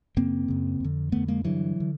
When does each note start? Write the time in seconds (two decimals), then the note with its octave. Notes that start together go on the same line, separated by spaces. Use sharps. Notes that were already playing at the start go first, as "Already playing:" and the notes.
0.17 F#2 C#3 A#3 C4
0.48 F#2 C#3
0.80 F2 D3
1.12 F2 D3 A3 B3
1.28 G#3 A#3
1.44 G2 D3 E3 F#3
1.80 D3